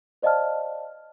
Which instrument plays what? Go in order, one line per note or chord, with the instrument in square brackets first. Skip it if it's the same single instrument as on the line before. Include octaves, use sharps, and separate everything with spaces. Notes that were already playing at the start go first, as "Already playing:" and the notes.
[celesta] C5 D5 D#5 F5 A5 F6